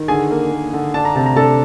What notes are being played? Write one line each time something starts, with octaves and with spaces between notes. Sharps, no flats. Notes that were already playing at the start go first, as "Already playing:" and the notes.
Already playing: D#3
D3 G#4 G#5
A#3
A#3
D3
D4 A5
A#5
C3 A5
A#5
D4 A4 A5